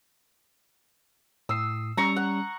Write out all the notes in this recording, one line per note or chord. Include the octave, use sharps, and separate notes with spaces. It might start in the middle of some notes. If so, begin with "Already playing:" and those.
A2 D#6 E6 C7
G3 C#4 A#5 C#6
F#5